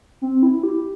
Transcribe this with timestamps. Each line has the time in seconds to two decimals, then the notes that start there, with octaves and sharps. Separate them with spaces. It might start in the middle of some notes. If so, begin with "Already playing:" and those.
0.22 C4
0.43 E4
0.63 G4